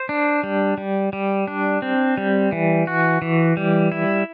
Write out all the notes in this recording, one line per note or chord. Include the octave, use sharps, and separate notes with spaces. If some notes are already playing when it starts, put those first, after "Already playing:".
Already playing: C5
D4
G3
G3
G3
D4
C4
G3
E3
F#4
E3
G3
E4